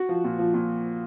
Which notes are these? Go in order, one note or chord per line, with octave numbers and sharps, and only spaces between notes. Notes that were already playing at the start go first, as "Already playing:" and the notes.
Already playing: F#4
F3
A#2
F3
A#2